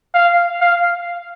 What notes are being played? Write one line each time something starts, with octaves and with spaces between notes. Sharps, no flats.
F5
F5